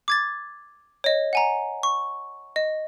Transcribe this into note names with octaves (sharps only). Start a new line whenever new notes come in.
D6 G#6 A6
C#5 D#5
F#5 G#5 A#5
C#6
D#5